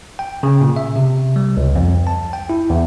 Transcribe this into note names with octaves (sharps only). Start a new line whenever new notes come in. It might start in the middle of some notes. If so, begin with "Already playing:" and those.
G5
C#3
A#2
E5
C3
G3
C#2
F2
A5
G5
E4
E2